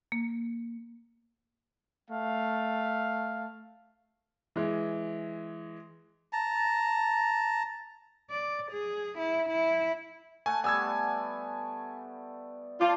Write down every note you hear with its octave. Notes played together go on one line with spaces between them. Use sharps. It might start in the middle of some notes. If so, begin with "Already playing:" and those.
A#3
A3 F5
E3 G#3
A5 A#5
D5
G#4
E4
E4
A3 F#5 G#5
G3 B3 G#5 E6 G#6
F4 C5 D5 A5 D6